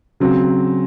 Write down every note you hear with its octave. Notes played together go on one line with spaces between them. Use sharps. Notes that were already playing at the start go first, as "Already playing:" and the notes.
C#3 F#3 C4